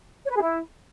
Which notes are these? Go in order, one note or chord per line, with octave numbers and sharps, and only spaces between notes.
C#5
B4
G#4
E4